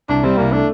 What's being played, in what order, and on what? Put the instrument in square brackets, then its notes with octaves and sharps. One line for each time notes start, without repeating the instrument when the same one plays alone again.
[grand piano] C2 [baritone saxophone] D4
[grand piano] G3 [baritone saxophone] C4
[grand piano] C2 [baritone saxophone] A#3
[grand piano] A3 [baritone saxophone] D4